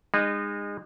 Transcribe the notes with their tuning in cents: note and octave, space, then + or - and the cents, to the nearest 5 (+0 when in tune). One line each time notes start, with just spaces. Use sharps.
G#3 -30 D#4 -30